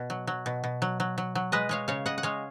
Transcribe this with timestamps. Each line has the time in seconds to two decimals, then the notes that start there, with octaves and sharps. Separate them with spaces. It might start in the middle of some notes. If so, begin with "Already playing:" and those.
Already playing: B2
0.10 F#3
0.27 F#3
0.46 B2
0.64 B2
0.82 F#3
1.00 F#3
1.18 F#3
1.35 F#3
1.52 G#3 B4 D#5
1.69 G#3 C#5 F5
1.88 C#3 C#5 F5
2.06 C#3 D#5 F#5
2.18 F#5
2.23 G#3 C#5 F5